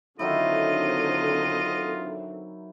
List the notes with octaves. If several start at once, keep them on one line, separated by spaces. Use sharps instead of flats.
D3 D#3 F#3 C4 E4 F4 D#5